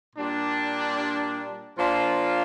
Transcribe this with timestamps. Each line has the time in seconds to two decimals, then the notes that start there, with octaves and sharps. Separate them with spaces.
0.14 A#2 G3 D4
1.77 A#2 F3 D4 F4